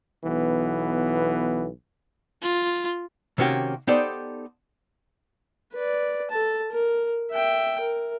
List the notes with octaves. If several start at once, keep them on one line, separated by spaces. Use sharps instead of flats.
B1 E3 B3
F4
C3 D#3 A#3 C#4 F#4 G4
B3 D#4 G4 A4 C5 D5
B4 D5
A4 A5
A#4
E5 G5
A#4